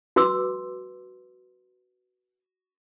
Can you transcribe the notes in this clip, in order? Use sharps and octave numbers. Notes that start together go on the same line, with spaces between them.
F#4 B4 C6 D6 E6